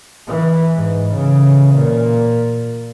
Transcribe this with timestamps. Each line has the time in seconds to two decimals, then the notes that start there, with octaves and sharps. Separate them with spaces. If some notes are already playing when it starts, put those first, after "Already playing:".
0.27 E3
0.75 G#2
1.13 C#3 E3
1.75 A#2